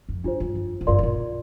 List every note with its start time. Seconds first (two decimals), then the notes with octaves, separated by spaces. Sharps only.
0.09 F2
0.24 G2 D4 F4 C5
0.40 G2
0.55 F2
0.81 G#2
0.87 G2 F4 A#4 D5 F5 C6
0.99 G#2
1.03 A#2